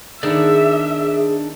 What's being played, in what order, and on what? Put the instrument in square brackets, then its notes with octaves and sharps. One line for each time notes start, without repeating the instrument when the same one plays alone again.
[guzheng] D#3 B3 [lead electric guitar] D4 D5 [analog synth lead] G#4 [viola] E5